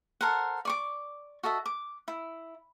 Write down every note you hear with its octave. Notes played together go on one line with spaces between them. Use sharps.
A4 A#4 C5 F#5
D5 C#6 D6
F#4 A4 D#5 E5
D6
E4